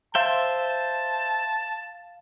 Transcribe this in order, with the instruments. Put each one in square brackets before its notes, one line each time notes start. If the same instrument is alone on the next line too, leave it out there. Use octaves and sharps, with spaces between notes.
[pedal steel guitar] C5 E5 G5 [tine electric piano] F5 [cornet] A5